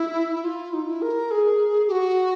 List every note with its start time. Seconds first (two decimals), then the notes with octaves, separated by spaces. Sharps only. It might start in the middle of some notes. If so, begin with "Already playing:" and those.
Already playing: E4
0.35 E4
0.44 F4
0.73 D#4
0.87 E4
1.02 A#4
1.31 G#4
1.87 G4
1.92 F#4